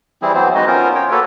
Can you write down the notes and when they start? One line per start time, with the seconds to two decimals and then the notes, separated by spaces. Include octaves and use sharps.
0.22 E3 G3 C4 E4 G#4
0.34 E3 F#3 B3 C4 C5
0.55 G#3 B3 D#4 F#4 D#5
0.67 B3 C#4 F4 A#4 C5
0.95 C#5 G5
1.11 A#3 F#4 A4 B4 C#5